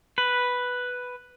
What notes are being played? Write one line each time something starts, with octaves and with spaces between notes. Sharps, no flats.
B4